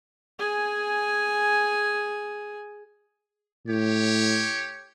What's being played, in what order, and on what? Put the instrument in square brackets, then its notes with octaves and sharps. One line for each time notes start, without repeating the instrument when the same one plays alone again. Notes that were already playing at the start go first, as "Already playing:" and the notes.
[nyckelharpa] G#4 G#5
[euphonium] A2 [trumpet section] G4 C#5